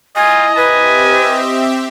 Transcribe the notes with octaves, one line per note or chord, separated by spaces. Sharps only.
E4 F4 D#5 G#5 A#5
C4 G4 B4 E5 G#5